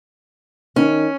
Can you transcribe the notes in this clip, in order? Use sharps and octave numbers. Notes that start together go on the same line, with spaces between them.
D#3 C#4